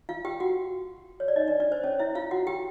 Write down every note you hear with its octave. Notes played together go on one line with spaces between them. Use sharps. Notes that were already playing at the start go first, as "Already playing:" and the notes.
F4 F5
G4 G5
F#4 F#5
C#5
D5
D#4 D#5
D4 D5
D4 D5
C5
C#4 C#5
E4 E5
F4 F5
F#4 F#5
G4 G5